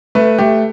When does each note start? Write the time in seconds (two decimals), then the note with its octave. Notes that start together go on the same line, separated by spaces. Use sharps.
0.15 A3 B4
0.38 A3 G4